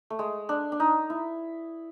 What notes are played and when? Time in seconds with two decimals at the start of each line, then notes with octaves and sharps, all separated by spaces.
0.10 A3
0.19 G#3
0.49 D4
0.72 D4
0.80 D#4
1.10 E4